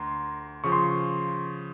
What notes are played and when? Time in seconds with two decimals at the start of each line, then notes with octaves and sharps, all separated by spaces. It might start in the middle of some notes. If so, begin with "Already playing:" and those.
Already playing: D2 A#5 C6
0.64 C#3 F3 C#6
0.72 C6